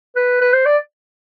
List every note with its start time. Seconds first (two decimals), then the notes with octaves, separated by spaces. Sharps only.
0.16 B4
0.41 B4
0.53 C5
0.66 D5